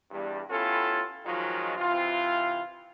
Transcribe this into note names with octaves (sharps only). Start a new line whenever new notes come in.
E2 G2 G3
B3 C#4 E4 F4 G4 A4
D#3 F3 F#3 G#3 F4
C3 E3 C4 F4